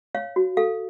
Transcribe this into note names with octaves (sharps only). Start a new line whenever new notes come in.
C#5 F5
F#4
A4 F5